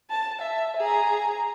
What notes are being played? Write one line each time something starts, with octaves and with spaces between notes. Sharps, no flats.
A5
E5
G#4 A#5